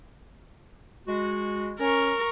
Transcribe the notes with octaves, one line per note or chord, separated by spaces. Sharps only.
G#3 F#4
C#4 A#4 C#6